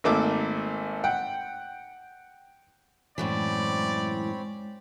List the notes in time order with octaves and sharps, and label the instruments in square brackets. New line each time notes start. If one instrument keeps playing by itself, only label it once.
[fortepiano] G#1 A3 A#3 D6 E6
F#5 G5
[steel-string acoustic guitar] F#2 A2 E3 [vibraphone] G#3 [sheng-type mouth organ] C4 C#5 B5 [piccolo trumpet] D5